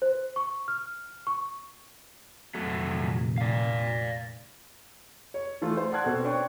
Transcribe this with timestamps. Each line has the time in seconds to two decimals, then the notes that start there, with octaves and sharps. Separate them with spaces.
0.02 C5
0.36 C#6
0.68 F6
1.27 C#6
2.55 F1 A#2 D#3 F#3 A3
3.38 D5 F5
5.34 C#5
5.62 E3 A3 F4
5.77 C5
5.91 D5 F#5 A5 C6 F#6 G#6
6.04 B2 C4 A4
6.24 D4 C5 C#5 G5 C#6